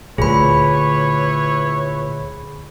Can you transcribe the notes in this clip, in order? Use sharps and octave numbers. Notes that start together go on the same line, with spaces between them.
D2 A#2 E4 G#4 B4 C#5 B5